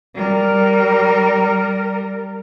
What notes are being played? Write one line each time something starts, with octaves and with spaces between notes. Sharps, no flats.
G3 A#4